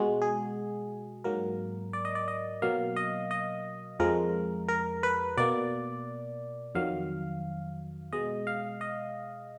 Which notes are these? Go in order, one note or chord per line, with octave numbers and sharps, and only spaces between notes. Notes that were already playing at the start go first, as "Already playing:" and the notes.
Already playing: B2 G#3 F#4
G#4
G#2 F#3 A#3 A#4
D5
D#5
D5
D#5
B2 F#3 A#3 F5
D#5
D#5
F2 F3 G#3 A#4
A#4
B4
B2 A#3 D5
F2 D#3 F#3 F5
B2 G#3 D#5
F5
D#5